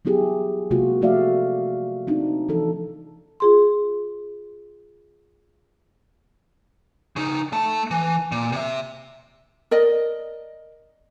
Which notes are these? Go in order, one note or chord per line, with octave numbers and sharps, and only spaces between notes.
F#3 B3 E4 G4 G#4
C3 G#3 A#3 F4 F#4
F3 A3 F#4 D5 E5 F5
C4 D4 D#4
E3 F3 A4
F4 G#4 C6
C#3 D#4
A3 A5
E3
A#2
C3 E5
A#4 D5 D#5